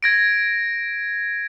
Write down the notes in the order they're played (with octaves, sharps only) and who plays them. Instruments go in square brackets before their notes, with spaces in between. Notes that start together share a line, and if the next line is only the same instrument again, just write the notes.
[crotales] G#6 A#6 D7